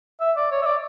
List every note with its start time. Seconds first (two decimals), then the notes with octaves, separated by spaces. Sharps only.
0.20 E5
0.37 D5
0.51 C#5
0.62 E5
0.66 D5